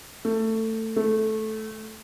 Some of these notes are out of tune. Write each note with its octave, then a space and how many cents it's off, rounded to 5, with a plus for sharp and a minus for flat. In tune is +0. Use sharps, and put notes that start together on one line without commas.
A3 +20
A3 -10